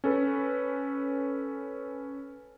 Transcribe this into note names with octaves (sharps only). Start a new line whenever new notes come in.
C#4 A4 B4